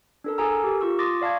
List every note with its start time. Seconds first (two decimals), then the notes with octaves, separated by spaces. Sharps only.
0.24 D4 A4 A#4
0.38 G#4 A4 G#5 A#5 E6
0.64 G4 A#4
0.81 F4 C#6 E6
0.99 C6 D6 D#6 A6 A#6
1.22 D5 F5 A5 C#6 G#6